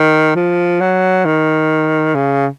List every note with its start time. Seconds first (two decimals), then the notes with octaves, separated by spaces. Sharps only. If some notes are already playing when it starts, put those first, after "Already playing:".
Already playing: D#3
0.36 F3
0.81 F#3
1.25 D#3
2.15 C#3